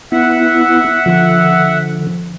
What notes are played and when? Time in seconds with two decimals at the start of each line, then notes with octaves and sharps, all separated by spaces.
0.12 B3 E4 E5 F#5
1.06 D3 F3